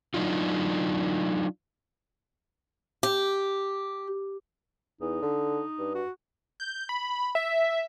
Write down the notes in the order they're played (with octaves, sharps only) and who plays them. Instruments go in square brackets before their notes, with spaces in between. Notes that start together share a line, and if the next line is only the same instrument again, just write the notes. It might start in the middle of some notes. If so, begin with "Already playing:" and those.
[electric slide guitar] F#3 D4 D#4 F4
[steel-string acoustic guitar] G4
[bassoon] E2 [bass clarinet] D#4
[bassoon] D3
G2
[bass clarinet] F#4
[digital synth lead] G6
B5
E5